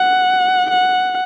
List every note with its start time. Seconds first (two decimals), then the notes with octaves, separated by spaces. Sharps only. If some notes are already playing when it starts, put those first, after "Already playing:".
Already playing: F#5
0.70 F#5